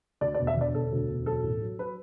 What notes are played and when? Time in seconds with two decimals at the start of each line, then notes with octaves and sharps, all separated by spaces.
0.21 D2 D5
0.35 D5
0.39 E1
0.47 E5
0.56 D3 D5
0.74 E1 A4
0.92 D2
1.09 E1
1.26 F#3 A4
1.44 A1
1.62 F#3
1.79 F#3 B4